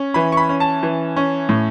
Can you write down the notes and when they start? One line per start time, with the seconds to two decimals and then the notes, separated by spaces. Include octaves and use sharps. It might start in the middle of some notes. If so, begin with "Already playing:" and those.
Already playing: C#4
0.14 E3 B5
0.32 C#6
0.37 B5
0.49 C#4
0.60 A5
0.83 E3
1.16 C#4
1.49 A2